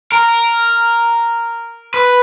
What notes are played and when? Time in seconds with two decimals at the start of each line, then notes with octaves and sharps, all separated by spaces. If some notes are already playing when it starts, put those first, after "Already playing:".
0.12 A#4
1.94 B4